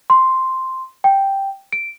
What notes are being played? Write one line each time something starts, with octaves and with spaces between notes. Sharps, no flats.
C6
G5
D7